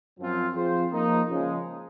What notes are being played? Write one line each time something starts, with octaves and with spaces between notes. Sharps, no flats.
F#2 F3 C4 F4
F3 C4 F4 G#4 C5
F3 A#3 D#4
C#3 F3 G#3